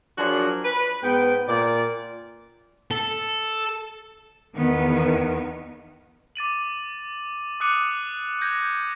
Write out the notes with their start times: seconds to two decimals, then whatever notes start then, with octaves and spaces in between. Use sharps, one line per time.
0.18 F3 F#3 D4 F#4 G#4 A#4
0.64 B4
1.03 G#2 B3 G5
1.48 A#2 D5
2.91 A4
4.55 E2 D#3 B3
6.36 D6 A6 D#7 F#7
7.60 D6 D#6 F#6 C#7 D#7
8.41 G6 G#6 A#6